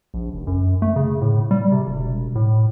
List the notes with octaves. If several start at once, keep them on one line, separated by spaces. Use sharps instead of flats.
A#1
F1
F#2
A3
C#3
A2
G3
C3
E1
A2